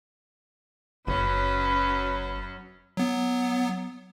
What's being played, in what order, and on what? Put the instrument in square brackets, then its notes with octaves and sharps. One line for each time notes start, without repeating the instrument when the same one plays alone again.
[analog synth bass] F#1 [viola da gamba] F#2 F#3 C#4 [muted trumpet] B4
[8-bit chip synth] F#3 B3